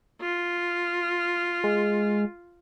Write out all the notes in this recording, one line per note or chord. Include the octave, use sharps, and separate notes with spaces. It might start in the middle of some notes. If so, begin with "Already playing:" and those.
F4
G#3